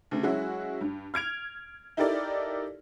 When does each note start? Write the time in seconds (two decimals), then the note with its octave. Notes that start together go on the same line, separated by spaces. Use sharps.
0.11 D2 C#3
0.23 F#3 G#3 C#4 E4 F#4
0.81 G2
1.14 F6 G#6 D7 F7
1.97 D#4 E4 G4 A4 A#4 D5